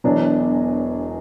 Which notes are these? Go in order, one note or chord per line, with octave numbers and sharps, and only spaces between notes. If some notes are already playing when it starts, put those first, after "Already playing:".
E1 E2 B2 F#3 D4